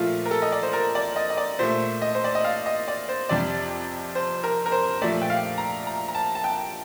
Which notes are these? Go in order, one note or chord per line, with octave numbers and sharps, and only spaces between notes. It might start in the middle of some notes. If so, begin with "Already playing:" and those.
Already playing: A#2 F3 A3 F4
A#4
A4
D#5
D5
C5
A#4
D5
D#5
D#5
D5
A#2 A3 C5
D#5
C5
D5
D#5
F5
D#5
D5
C5
F2 C3 G3 D5
C5
A#4
A#4
C5
A#2 F3 A3 D5
G5
F5
A#5
A#5
A#5
A5
A5
G5